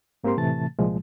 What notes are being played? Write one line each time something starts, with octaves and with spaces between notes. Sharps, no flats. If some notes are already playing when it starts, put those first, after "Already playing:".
G#2 A#3 C4 G4 A#4 C6
A2 C3 E3 A3 A5 A6
C2 A#2 F3 G#3